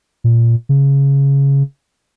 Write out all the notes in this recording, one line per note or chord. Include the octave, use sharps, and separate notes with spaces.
A#2
C#3